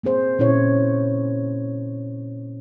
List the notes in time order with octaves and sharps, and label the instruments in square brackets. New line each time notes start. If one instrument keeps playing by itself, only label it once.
[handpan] A#3 C4 G#4 C5
A#2 C#4 E4 C#5